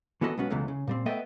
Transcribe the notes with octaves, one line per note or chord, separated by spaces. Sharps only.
E3 B3 F#4 A4 B4 D#5
B1 G#3 B3 C#4 F#4
C#2 B2 E3 F#3 G#3 A3
C#3
A#2 G3 C4
A3 B3 A4 D#5 E5 G5